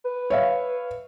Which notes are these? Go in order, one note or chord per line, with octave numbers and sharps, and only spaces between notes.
B4
C#5 E5 F5